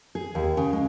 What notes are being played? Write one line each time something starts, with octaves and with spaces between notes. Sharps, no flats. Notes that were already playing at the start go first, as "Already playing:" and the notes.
G#4
D#2
C#3
G#3